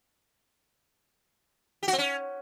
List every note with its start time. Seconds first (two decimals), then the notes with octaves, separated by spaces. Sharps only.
1.83 G4
1.88 F#4
1.93 C4
1.98 C#4